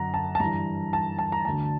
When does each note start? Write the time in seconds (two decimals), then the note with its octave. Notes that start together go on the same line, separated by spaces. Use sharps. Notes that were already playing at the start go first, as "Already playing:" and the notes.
Already playing: F#2 D3 F#5 A#5
0.14 A5
0.35 A5
0.40 G2 E3 A#5
0.93 A5
1.19 A5
1.32 A#5
1.45 D2 D3 A5